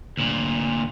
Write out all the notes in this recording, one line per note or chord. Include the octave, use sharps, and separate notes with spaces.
D2 A#2